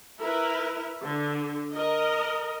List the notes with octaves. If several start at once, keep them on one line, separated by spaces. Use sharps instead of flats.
E4 A#4 B4
D3
A#4 D#5